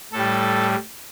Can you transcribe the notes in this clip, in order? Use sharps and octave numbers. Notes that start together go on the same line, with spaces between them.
A2 G3 A4